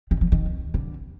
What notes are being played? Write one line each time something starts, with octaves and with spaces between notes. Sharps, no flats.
D#3
F3
D#3
D3